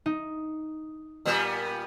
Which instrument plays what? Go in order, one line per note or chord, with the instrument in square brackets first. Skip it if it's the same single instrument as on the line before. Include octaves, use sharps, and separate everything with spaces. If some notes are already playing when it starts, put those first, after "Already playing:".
[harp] D#4
[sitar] A#2 G3 B3